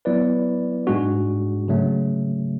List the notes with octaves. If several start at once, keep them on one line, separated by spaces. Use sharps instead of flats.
F#3 B3 E4 B4 D5
G#2 G#3 D4 F#4
C#3 F#3 A3